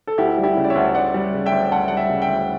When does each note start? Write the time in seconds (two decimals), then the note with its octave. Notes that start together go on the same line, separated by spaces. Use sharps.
0.07 A4
0.18 D2 E4 G4
0.38 G3
0.43 E4 G4
0.57 C#3
0.64 D5
0.70 C#5 E5
0.75 D2
0.95 D2 D5 F#5
1.14 G3
1.34 C#3
1.46 E5 G5
1.52 D2
1.71 D2 F#5 A5
1.88 G3 F#5
1.97 E5 G5
2.10 C#3
2.22 E5 G5
2.28 D2